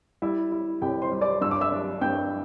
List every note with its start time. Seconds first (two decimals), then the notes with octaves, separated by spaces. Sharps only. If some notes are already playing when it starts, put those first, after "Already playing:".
0.22 G3 E4 E5
0.52 E4
0.82 C2 G4 G5
1.02 C5 C6
1.12 G3
1.21 D5 D6
1.41 G2 E6
1.51 D6
1.61 E5 E6
1.71 D4
2.01 G2 G5 G6